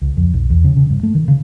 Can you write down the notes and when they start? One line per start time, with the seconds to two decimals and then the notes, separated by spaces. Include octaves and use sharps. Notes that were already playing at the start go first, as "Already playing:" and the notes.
0.02 C#2
0.17 F2
0.34 B1
0.50 E2
0.64 C#3
0.77 C#3
0.90 G2
1.03 A3
1.15 D#3
1.28 C#3